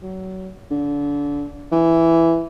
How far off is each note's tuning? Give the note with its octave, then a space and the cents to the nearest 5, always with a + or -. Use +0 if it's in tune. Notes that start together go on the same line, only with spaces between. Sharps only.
F#3 +25
D3 -30
E3 +5